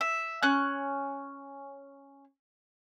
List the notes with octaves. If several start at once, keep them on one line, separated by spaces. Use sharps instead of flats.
E5
C#4 F#6